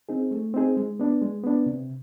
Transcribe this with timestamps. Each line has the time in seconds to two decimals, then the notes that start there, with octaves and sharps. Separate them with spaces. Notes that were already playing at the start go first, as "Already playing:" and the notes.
0.09 C4 D#4 G#4
0.31 A3
0.54 C4 D#4 G#4
0.77 G#3
1.00 B3 D4
1.22 G#3
1.44 B3 D4
1.66 C3